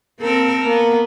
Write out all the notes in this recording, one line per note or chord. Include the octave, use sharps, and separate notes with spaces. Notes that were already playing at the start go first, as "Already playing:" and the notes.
A#3 C4 A4 A#4
A#3 B3